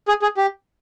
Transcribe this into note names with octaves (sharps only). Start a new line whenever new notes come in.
G#4
G#4
G4